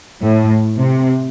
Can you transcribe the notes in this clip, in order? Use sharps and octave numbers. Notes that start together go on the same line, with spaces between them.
A2
C3